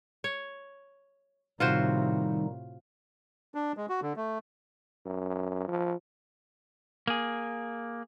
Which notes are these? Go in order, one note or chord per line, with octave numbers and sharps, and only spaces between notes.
C#5
A2 C3 D#3 G3 D#4 F4 F#4 C5
D4
G#3
F#4
D3
A3
F#2
F3
A#3 G#4